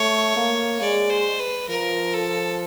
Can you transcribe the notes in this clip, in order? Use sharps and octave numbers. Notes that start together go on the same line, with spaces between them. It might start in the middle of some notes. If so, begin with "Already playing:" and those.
Already playing: A3 C#5
A#3
G#3 D5
C5
B4
F3 A#4
A4